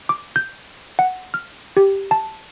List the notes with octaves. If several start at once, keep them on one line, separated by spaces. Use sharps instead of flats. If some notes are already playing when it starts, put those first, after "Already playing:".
D6
G6
F#5
F6
G4
A5